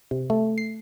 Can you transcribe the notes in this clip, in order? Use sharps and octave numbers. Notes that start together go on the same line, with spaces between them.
C3
A3
C7